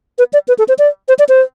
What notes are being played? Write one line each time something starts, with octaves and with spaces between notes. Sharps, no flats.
B4
D5
B4
A4
C5
D5
C5
D5
C5